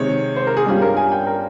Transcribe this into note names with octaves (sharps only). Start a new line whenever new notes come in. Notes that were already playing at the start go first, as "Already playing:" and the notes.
Already playing: C3 D#3 G#3 C4 C#5
C5
A#4
G#4
G2 G3 C#4 F4 G4
A#4
G#5
G5
A#4